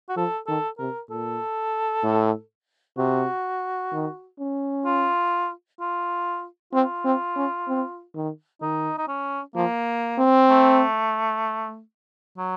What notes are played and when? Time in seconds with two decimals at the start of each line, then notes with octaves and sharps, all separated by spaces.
0.09 F#4
0.16 F3 A4
0.47 D#3 A4
0.78 C3 A#4
1.10 A#2 A4
2.03 A2
2.97 C3 F#4
3.92 D#3
4.39 C#4
4.85 F4
5.80 F4
6.73 C4 F4
7.05 C4
7.36 C#4
7.68 C4
8.15 D#3
8.61 D#3 D#4
8.98 D#4
9.08 C#4
9.55 F3 A#3
10.18 C4
10.50 A3
12.37 F#3